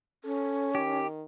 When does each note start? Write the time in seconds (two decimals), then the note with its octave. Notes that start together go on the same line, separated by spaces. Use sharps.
0.24 C#4 A4
0.75 D#3 G4